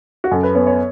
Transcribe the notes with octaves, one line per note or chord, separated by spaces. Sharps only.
F#4
F#2 A4
B4
B3 C#5
C#5